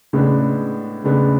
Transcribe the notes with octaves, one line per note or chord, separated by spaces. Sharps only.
A2 C#3 G#3 B3 D4
A2 C#3 G#3 B3 D4